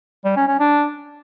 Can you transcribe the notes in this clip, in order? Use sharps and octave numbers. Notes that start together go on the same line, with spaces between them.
G3
C#4
C#4
D4